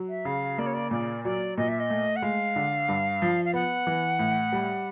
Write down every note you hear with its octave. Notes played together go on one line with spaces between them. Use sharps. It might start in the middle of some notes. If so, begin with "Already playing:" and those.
Already playing: F#3
E5
C#3 F5
A#3 D5
C#5
D5
A#2 D5
F#3 D5
A#2 D#5
E5
D#5
A3
F#5
G#3 F5
D3
G2
F3
F5
B3 F#5
E3
A2
G3